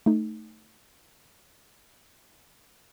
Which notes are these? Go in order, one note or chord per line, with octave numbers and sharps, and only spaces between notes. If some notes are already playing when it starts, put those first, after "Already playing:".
A3 D#4